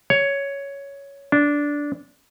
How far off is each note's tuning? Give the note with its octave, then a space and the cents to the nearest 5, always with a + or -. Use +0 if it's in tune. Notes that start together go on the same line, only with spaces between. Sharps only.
C#5 +10
D4 -10